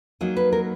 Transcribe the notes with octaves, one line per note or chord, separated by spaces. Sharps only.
F#3 A#3 D#4 G#4
B4
A#4